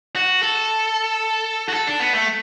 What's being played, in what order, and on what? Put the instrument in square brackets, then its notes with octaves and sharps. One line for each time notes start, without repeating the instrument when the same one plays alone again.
[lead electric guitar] F#4
A4
F#4
A4
D4
B3
A3